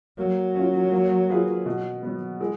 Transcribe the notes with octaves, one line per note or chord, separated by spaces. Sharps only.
F#3 A#3
C#4 F4
A#3
F4 G#4 B4
B2
F#3 B3
G#3